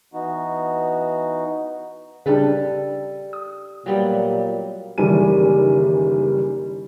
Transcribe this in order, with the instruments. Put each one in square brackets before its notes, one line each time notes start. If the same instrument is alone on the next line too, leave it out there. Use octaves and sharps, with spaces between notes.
[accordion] E3 B3 D#4 F#4
[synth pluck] C#3 D4 [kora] G3 A4 B4
[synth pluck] D#6
[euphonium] A#2 [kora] F#3 G3 B3
[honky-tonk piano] F#1 D#3 E3 G3 G#5 D#7